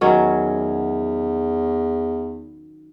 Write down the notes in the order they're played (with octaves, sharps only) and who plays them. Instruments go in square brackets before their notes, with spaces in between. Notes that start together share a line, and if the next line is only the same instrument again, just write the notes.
[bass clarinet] E2 [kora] D#3 F#3 C#4